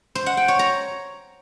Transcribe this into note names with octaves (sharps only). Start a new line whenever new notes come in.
C5
F#5
G5
C#5
A#5